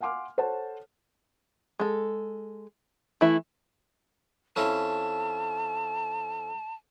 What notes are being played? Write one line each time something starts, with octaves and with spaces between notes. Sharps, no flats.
F5 F#5 G#5 C6 D6 F6
A4 C5 C#5 F#5 A5
G#3 A4
E3 A3 E4
F2 C#4 E4 A5